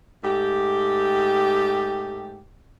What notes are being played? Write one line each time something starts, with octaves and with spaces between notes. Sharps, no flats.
G#2 A3 G4